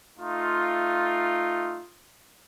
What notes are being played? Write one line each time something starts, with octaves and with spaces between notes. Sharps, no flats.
A3 D#4 F4